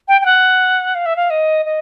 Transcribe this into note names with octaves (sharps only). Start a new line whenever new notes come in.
G5
G5
F#5
F5
E5
F5
D#5
D#5